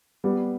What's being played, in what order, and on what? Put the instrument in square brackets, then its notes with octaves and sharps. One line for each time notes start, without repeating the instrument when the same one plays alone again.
[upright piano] G3 B3